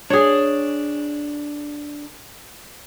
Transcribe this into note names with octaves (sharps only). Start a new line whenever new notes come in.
D4 G#4 C#5